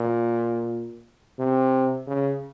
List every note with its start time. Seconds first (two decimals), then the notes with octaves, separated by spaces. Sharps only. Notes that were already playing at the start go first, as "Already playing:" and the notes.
Already playing: A#2
1.39 C3
2.07 C#3